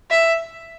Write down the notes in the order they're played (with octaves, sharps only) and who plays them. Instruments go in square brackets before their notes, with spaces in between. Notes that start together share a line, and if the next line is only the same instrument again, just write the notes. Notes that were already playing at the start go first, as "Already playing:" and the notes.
[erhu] E5